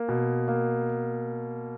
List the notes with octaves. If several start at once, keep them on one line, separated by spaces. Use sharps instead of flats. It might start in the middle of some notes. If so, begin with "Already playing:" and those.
Already playing: A#3
B2
A#3